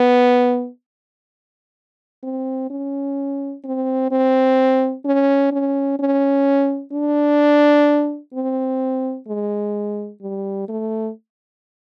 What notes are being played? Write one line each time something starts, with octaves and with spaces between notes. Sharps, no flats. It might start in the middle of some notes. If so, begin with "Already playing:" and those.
Already playing: B3
C4
C#4
C4
C4
C#4
C#4
C#4
D4
C4
G#3
G3
A3